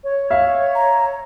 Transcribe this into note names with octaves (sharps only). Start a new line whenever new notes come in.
C#5
E5 F5
A#5